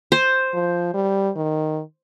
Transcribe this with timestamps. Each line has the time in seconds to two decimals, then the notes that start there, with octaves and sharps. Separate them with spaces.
0.12 C5
0.54 F3
0.93 G3
1.36 D#3